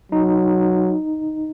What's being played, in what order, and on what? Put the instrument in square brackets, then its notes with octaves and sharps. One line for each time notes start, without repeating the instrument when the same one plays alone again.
[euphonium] F#3 [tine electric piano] D#4